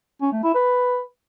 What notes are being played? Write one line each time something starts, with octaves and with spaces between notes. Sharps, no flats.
C#4
A3
E4
B4